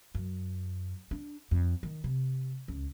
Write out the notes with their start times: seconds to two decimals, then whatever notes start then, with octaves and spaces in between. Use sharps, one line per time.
0.15 F#2
1.11 D4
1.51 F2
1.83 D#3
2.04 C3
2.68 C#2